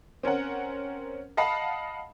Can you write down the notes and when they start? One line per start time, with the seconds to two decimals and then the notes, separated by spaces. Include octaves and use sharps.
0.23 C4 C#4 A#4 F#5
1.37 D#5 F5 F#5 A5 B5